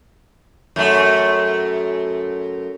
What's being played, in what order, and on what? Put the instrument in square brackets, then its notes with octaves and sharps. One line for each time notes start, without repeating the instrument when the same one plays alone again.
[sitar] F#2 A3